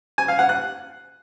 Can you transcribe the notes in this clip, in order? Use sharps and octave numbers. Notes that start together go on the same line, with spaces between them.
G#5
F5
F#5
F#6